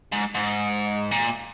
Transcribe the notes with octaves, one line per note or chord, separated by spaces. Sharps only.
G#2
G#2
A#2